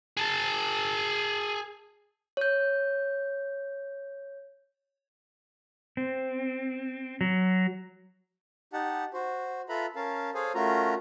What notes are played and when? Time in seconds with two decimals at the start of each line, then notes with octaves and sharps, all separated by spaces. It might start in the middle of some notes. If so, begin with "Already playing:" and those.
0.17 G#4 A5
2.37 C#5 G6
5.97 C4
7.21 F#3
8.73 D#4 G4 F#5 A5
9.14 F#4 C5
9.69 F4 A4 B4 E5 A#5 B5
9.96 C#4 A#4 F5 A5
10.34 G#4 A4 C5 C#5 F5 G#5
10.55 A3 C#4 F4 F#4 A#4 A#5